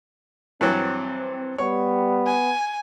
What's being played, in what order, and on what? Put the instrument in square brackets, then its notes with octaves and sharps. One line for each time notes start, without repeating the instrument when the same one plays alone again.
[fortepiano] G2 E3 F#3 [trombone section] C4
[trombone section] G3 [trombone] B3 [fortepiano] C#5
[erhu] G#5